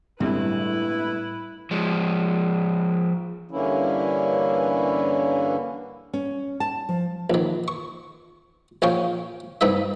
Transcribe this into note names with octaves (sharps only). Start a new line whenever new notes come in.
G1 A2 C3 G#3 E4 B4
F3 G#3
G2 D3 E3 A#3 C#4 E4
C#4
A5
F3
A#1 D#3
C#6
A#1 C#4 F5 G5 C#6
C2 G2 G3 D#4 E5